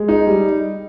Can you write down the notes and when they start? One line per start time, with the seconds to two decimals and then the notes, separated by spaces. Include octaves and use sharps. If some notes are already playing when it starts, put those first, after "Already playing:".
Already playing: G#3
0.09 D#4
0.27 G3